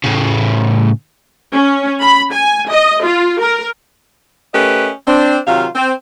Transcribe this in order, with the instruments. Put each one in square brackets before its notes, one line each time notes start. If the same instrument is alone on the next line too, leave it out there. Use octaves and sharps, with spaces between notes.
[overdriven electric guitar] A2 C#3
[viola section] C#4
B5
G#5
D#5
F4
A#4
[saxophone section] A3 C#4 G4 A#4 B4 D#5
C4 D4
C3 D#3 F#3 F4 F5
C4